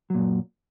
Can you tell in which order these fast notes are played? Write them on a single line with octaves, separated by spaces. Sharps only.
F#3 A#2 F#2